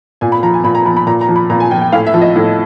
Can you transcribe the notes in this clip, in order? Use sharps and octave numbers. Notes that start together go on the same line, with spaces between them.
A#2 G#5
B5
F3 A#5
G#5
A#2 B5
A#5
F3 B5
B5
A#2 A#5
A#5
F3
B5
A#2 A#5
G#5
F3 G5
G5
A2 F5
E5
F3
D#5
A2